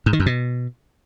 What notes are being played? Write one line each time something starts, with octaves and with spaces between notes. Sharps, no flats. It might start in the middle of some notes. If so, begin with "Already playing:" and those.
G#2
D#3
F#2
B2